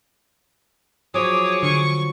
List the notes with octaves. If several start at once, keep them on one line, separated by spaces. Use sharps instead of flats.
F3 F#3 G#4 C#5 D6 D#6
D3 C#6